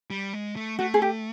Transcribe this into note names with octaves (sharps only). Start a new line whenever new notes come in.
G3
G#3
A3
A3 F#4
G#4
G4